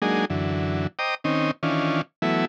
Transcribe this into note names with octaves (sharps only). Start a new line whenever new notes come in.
F#3 G#3 A#3 D4 D#4 G#4
F#2 D3 E3
C5 D#5 G5 A#5 D6 D#6
D#3 C4 C#4 D#4
D#3 E3 C#4 D4 F4
E3 F#3 A3 B3 E4